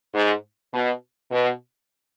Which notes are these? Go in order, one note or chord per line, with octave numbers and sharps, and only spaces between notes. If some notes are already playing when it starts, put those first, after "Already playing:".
G#2
B2
B2